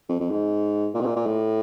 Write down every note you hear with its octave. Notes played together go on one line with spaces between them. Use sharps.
F2
F2
G#2
A#2
B2
A#2
A#2
A2